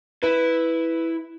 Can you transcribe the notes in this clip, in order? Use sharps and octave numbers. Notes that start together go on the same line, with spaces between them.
E4 B4